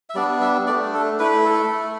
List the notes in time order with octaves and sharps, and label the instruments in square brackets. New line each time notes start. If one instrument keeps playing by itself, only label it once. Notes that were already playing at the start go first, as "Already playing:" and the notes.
[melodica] E5
G3 B3 D4 D5
E5
A3 D4 D5
A4
A3 E4 B4
A4
A3 E4